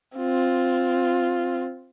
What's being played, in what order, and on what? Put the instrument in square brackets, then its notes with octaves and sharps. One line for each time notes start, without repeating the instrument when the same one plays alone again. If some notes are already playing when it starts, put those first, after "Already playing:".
[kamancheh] C4 F4